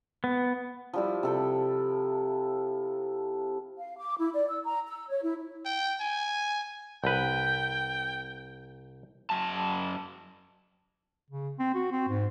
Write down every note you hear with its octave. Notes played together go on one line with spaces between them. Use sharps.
B3
F3 G3 E4
C3 A4 G5
F5
D6
E4
D5
E6
A#5
E6
C#5
E4
G5
G#5
C2 B4 G5
F#2 A5
C#3
C4
F#4
C4
G#2